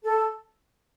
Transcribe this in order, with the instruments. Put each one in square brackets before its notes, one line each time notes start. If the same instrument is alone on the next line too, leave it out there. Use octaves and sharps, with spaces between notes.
[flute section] A4